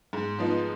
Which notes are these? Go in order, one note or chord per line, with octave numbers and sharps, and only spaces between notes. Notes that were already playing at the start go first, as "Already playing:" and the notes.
G#2
F3 B3 D#4